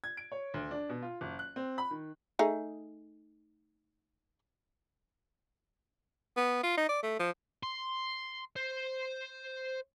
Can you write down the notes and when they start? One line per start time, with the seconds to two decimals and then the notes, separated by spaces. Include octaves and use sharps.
0.04 G#6
0.17 D7
0.32 C#5
0.54 D2
0.71 D4
0.89 B2
1.02 F4
1.21 F#1
1.39 F#6
1.56 C4
1.78 B5
1.91 D#3
2.39 A3 D#4 G#4
6.37 B3
6.63 F4
6.77 D#4
6.89 D5
7.03 A3
7.20 F3
7.63 C6
8.56 C5